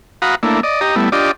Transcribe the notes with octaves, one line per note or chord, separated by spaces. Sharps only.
F#4 F5 F#5 A#5 B5 D#6
A3 A#3 D4 E4
D5 D#5
G4 D#5 A#5
G3 A3 B3 E4
D4 F4 G4 D5 D#5